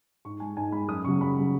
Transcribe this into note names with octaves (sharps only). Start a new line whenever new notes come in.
G#2 C#6
G#3 G#5
G#2 G#5
G#3 B5
F#2 D#6
C#3 F#3 C#6
F#2 B5
C#3 F#3